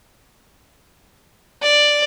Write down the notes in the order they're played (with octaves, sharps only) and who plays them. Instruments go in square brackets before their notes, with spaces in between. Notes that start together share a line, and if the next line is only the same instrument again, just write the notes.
[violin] D5